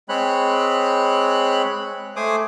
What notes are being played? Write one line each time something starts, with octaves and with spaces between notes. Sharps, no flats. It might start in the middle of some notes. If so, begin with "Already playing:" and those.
G#3 C4 C#5 B5 F#6
A3 C5 G#5 D6 D#6